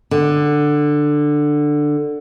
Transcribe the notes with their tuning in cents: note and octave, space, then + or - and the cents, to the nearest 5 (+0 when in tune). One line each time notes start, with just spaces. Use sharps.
D3 +10